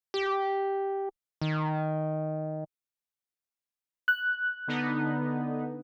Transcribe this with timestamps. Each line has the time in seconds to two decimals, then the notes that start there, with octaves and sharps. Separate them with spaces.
0.14 G4
1.42 D#3
4.08 F#6
4.68 D3 B3 D#4